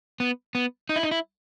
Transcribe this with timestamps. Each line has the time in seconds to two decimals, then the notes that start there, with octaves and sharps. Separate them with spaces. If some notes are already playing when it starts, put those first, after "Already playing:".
0.20 B3
0.55 B3
0.89 D#4
0.96 E4
1.03 D#4
1.11 E4